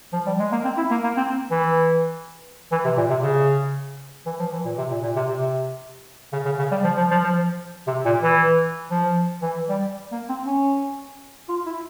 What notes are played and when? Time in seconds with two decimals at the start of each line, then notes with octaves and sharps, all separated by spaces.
0.13 F3
0.27 G3
0.39 G#3
0.52 A#3
0.65 C4
0.77 E4
0.91 A#3
1.04 A#3
1.17 C4
1.51 E3
2.72 E3
2.85 C3
2.97 A#2
3.10 C3
3.23 C#3
4.26 E3
4.40 F3
4.53 E3
4.65 A#2
4.78 C3
4.91 A#2
5.03 A#2
5.16 C3
5.29 C3
6.33 C#3
6.45 C#3
6.59 C#3
6.72 G3
6.84 F3
6.97 F3
7.11 F3
7.24 F3
7.87 C3
8.06 A#2
8.23 E3
8.91 F3
9.42 E3
9.69 G3
10.12 A#3
10.29 C4
10.46 C#4
11.49 F4
11.66 E4